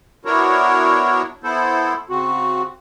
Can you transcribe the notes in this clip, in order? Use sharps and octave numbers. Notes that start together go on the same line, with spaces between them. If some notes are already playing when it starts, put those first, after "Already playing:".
B3 D4 E4 F#4 A#4 C#5
B3 E4 A4 C5
C#3 C4 F#4